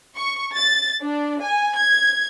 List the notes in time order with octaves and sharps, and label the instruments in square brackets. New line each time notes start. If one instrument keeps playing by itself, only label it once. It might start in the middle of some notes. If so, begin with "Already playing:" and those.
[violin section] C#6
A6
D4
G#5
G#6